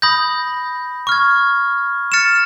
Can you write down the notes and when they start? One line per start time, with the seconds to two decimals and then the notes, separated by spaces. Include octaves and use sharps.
0.02 B5 D#6 G6 A#6
1.07 C#6 F6 G#6
2.12 F6 A6 C#7 E7